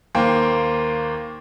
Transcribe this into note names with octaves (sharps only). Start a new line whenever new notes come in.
D#2 A#3 C5 G5